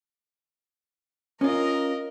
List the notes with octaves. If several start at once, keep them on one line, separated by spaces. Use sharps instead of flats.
C#4 F4 A#4 D#5